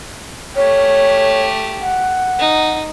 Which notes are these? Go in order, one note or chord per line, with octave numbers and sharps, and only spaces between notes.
A3 G4 C#5
F#5
D#4